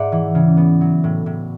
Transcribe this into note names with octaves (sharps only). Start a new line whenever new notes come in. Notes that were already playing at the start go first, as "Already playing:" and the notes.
Already playing: G#2 D5 E5 F#5
E3
C#3
B3
F#3
A2
A2